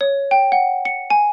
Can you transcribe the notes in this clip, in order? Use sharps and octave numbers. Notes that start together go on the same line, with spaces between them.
C#5
G5
F#5
C#7
G#5